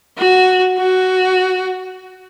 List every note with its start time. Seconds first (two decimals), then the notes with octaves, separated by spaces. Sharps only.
0.18 F#4
0.79 F#4